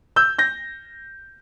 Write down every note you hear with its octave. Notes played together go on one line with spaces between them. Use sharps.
E6 G6
G6 A#6